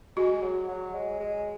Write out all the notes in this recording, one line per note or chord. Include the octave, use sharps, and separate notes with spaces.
G#3 F#4
F#3
F#3
G#3
G#3